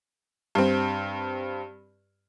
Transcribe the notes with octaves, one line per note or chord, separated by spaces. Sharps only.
G2 C4